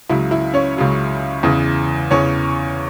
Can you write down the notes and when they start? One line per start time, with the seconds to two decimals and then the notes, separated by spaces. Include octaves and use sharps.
0.10 C#2 C#3 F#3 E4 E5
0.31 E4 E5
0.54 C#4 C#5
0.77 C#2 C#3 F#3
1.43 E2 C#3 E3
2.11 E2 C#3 E3 C#4 C#5